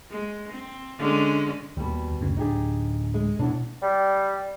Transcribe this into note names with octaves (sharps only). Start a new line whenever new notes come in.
G#3
C4
D3 G#3 C#4
D#2 B2 G3
F#1 D2 C#3
D1 D4 D#4 G4 G#4
G#3
E2 B2 D4
G3